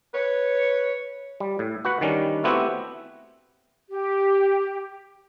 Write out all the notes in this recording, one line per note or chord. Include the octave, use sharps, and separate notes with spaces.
B4 C#5
G3
A2
F#4 B4 F#5
D#3 G3 C#4 D4
A3 B3 C4 E4 F#4 G4
G4